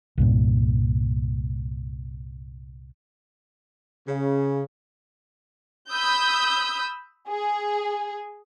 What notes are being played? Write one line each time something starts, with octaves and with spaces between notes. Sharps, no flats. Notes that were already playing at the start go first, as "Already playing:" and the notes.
C2 G2 A#2
C#3
B5 D#6 E6 G6
G#4